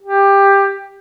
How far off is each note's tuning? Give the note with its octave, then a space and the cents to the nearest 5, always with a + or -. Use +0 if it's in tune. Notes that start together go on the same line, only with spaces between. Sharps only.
G4 +15